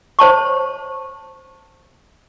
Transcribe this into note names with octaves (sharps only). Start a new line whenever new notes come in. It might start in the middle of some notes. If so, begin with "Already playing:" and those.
C5 C#5 A5 C#6